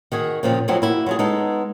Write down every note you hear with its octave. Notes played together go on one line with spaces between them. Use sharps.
D#3 F#4 G#4
A#2 C#3 F3 C4
F3 F#3 A3 C4 D#4 E4
A#3 E4 F#4
F#3 F4 G#4
G#3 B3 D#4 A4